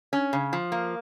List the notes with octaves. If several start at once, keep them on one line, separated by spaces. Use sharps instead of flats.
C#4
C#3
F3
A#3